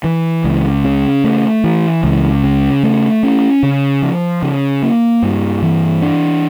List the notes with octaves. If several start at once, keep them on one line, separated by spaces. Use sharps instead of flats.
E3
C#2
C#3
A3
E3
C#2
C#3
A3
C#4
C#3
F3
C#3
A#3
G2
E3
D4